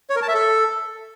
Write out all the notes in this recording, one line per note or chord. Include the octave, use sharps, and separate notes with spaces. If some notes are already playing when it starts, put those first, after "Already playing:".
C#5
A#4
A5
E5
A4